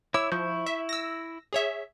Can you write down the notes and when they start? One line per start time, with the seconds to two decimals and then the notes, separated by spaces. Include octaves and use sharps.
0.14 E4 C#5 D6 E6
0.32 F3 E4 C#6 G6
0.66 E5
0.89 E6 A#6
1.53 G#4 C#5 E5